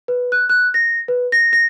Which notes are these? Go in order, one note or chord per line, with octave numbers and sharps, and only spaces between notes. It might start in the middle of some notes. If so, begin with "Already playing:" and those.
B4
F#6
F#6
A#6
B4
A#6
A#6